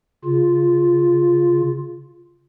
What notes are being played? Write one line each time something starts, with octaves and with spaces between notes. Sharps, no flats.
C#3 F4